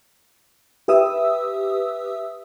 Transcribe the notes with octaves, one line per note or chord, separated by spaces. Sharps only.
G4 B4 E5 D#6 E6